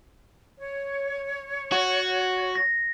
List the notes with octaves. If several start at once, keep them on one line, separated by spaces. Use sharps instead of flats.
C#5
F#4
A#6